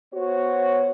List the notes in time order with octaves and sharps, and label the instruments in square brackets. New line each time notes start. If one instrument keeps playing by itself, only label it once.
[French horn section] B3 F#4 C5 C#5